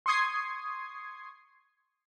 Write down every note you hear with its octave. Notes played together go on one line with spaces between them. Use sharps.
C6 C#6 D#6 G#6 C7